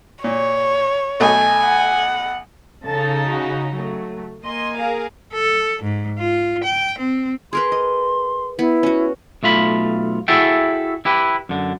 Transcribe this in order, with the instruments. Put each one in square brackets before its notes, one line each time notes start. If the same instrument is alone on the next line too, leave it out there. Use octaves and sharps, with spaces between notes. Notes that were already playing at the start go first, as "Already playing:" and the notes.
[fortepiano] A#2 [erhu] C#5
[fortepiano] B1 A3 D#5 [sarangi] G#5
[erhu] F#5
[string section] C#3 D#4 [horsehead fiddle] A4 A5
[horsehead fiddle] F#4
F#3 A3
[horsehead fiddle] A#3 G#5 [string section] D#5 C6
[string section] G#4 A#4 F5
[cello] A4
G#2
F4
G5
C4
[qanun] G#4 A#4 B4 [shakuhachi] C6
[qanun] D#5
[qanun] B3 [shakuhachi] E4
[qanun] C#4 F#4
[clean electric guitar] B1 A3 F4 B5
E4 F#4 G#4 A4 E5 G5
E4 G4 B4
F#2 D3